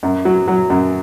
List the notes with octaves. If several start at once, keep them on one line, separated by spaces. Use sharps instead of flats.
F#2
F#3
F#3
F#2